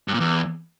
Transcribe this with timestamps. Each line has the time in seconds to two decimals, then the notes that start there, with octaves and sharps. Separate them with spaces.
0.08 G2
0.14 A#2
0.20 E2